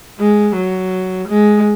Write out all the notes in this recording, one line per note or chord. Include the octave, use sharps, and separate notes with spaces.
G#3
F#3
G#3